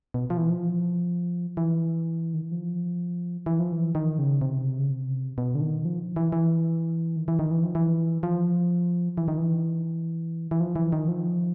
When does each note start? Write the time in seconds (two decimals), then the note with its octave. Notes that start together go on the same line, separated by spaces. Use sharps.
0.14 B2
0.30 F3
0.37 E3
0.50 F3
1.57 E3
2.34 D#3
2.42 E3
2.52 F3
3.46 E3
3.59 F3
3.72 E3
3.95 D#3
4.18 C#3
4.41 C3
4.79 C#3
4.90 C3
5.38 B2
5.55 D3
5.61 D#3
5.85 F3
6.16 E3
6.32 E3
7.16 D#3
7.28 E3
7.39 D#3
7.51 E3
7.63 F3
7.75 E3
8.23 F3
9.18 E3
9.28 D#3
9.38 E3
10.51 E3
10.60 F3
10.76 E3
10.93 D#3
11.08 F3